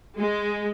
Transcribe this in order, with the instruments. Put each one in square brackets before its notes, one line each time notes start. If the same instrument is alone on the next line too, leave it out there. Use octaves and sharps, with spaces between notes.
[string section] G#3